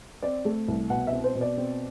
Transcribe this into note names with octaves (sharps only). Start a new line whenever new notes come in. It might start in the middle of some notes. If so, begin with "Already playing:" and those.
C4 D5
A3
C2
B2 F#5
E5
C4
C5
B2
D5
C4